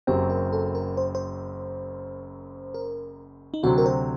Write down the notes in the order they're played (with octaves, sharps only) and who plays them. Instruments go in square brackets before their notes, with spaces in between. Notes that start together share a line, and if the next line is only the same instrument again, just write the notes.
[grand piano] F#1 F#2 F#3 C4 [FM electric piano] G4
[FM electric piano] A#4
A4
A#4
C5
C5
A#4
D#4
[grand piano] D2 C3 F#3 C4 [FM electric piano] F#4
[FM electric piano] A#4
C5